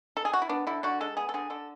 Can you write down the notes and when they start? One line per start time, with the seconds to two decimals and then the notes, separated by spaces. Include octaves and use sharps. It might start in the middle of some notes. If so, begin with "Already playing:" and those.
0.17 A4
0.25 G#4
0.33 F#4
0.42 E4
0.49 B3 D4
0.67 D3 E4
0.83 D3 F#4
1.01 G#3 A4
1.17 B3 G#4
1.29 A4
1.34 D3 G#4
1.50 D3 A4